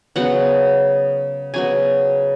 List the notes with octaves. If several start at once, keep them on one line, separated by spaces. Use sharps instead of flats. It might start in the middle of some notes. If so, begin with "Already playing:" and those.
C#3 F#3 B3 F#5
C#3 F#3 B3 G#5